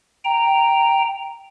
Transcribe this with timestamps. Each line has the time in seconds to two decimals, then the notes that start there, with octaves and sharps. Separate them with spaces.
0.25 G5 A#5